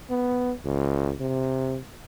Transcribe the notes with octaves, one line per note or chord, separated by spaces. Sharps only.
B3
C#2
C3